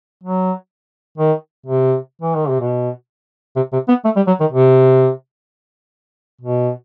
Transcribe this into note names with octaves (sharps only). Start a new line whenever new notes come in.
F#3
D#3
C3
E3
D#3
C3
B2
C3
C3
B3
A3
G3
F#3
D#3
C3
B2